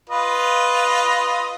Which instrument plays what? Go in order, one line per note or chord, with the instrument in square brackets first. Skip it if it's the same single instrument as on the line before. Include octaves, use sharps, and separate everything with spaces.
[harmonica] F4 B4 D#5